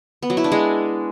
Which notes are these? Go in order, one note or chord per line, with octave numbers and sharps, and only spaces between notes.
B3
F#3
E4
D4
G#3